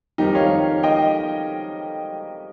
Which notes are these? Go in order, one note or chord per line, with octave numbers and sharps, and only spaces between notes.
F2 D#3 G3 D#4 G4
C#5 F5
D#5 G5